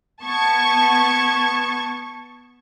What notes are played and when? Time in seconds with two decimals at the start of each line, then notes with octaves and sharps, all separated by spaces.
0.22 B3 A5 C#6 G#6